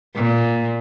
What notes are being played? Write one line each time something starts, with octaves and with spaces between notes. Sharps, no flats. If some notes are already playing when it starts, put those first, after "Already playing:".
A#2